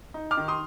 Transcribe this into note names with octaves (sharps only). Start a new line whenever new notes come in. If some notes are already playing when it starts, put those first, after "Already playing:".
D#4
D6 F6
D#3
C6 D#6